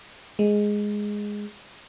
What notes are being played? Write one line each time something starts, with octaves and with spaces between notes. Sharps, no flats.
G#3